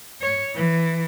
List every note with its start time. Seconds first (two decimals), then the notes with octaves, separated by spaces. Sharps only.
0.21 C#5
0.55 E3